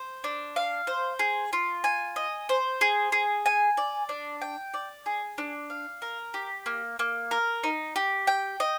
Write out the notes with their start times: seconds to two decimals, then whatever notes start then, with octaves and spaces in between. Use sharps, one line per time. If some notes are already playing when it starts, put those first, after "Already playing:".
Already playing: C5
0.24 D4
0.56 F5
0.87 C5
1.19 G#4
1.53 F4
1.84 G#5
2.16 D#5
2.49 C5
2.81 G#4
3.12 G#4
3.46 G#5
3.77 D5
4.09 D4
4.42 G5
4.74 D5
5.06 G#4
5.38 D4
5.70 F5
6.02 A#4
6.34 G4
6.66 A#3
6.99 A#3
7.31 A#4
7.64 D#4
7.96 G4
8.27 G5
8.60 D#5